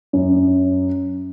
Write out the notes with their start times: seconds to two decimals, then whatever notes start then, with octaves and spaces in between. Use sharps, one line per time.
0.13 F#2